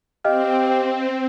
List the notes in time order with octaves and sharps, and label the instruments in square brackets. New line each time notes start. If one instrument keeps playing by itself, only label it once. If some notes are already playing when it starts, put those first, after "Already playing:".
[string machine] C4 [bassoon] G4 [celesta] D#5 F5 F6